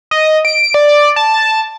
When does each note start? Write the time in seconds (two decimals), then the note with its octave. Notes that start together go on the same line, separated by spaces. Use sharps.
0.11 D#5
0.45 D7
0.74 D5
1.16 A5